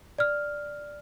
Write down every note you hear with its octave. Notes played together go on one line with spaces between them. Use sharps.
D5 F6